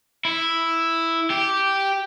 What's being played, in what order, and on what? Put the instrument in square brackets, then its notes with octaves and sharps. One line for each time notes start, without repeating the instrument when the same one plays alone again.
[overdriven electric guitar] E4
G4